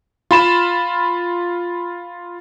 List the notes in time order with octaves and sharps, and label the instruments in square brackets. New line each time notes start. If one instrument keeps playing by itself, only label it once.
[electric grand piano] F4 B5 E7